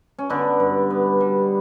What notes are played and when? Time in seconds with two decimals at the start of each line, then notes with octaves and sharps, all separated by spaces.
0.18 C#4
0.30 D3 B3 D4
0.60 G2
0.90 B3
1.21 G3